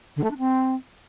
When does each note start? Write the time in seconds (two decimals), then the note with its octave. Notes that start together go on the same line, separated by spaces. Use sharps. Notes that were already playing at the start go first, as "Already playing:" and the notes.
0.16 D3
0.24 A3
0.31 D4
0.38 C4